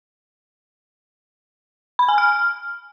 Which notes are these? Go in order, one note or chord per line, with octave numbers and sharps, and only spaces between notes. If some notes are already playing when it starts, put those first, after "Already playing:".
B5
G#5
F6